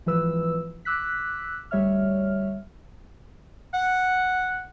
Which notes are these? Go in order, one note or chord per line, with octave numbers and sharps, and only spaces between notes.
G#1 E3 F3 B4 E6
D6 E6 F#6 B6
D2 G3 C#5 E5 F6
F#5